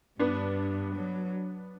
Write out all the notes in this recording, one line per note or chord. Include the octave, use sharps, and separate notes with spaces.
G2 B3 D4
F#3